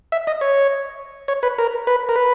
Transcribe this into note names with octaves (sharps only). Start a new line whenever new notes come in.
E5
D#5
C#5
C#5
B4
A#4
B4
A#4
B4